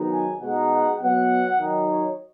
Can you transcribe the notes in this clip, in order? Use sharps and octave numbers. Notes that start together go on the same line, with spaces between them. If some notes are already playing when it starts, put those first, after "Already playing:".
Already playing: G#2 D#3 F#3 B3 D#4
G#5
B2 G#3 D#4 F#5
F#5
B2 F#3 B3 F#5
D#3 F#3 D#4
C#5